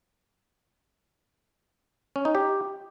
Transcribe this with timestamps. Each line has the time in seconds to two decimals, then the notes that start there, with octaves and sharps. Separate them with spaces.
2.16 C#4
2.25 D#4
2.35 G4